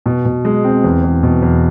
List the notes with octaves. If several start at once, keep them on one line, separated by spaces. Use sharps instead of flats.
B2
B2
G#3
C4
E2
E2
B2
E2